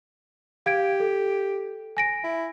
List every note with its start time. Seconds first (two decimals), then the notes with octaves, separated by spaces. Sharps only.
0.66 G4 F5 G#6 D7
1.00 A4
1.97 G#5 A#6 D7
2.24 E4